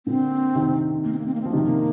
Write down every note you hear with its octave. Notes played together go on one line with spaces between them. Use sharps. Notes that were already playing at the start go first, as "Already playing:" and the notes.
A#2 D3 C4
C3 D#3
A#3
C4
A#3
C4
A#3
C4
F3
A#3
C3 D#3 C4
A#3